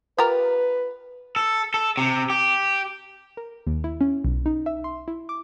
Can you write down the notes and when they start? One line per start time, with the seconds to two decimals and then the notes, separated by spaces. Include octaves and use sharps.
0.18 F4 G4 A#4 B4
1.36 A4
1.74 A4
1.97 C3
2.30 G4
3.37 A#4
3.67 D#2
3.84 E4
4.01 C#4
4.25 B1
4.46 D#4
4.66 E5
4.84 C6
5.08 E4
5.29 D6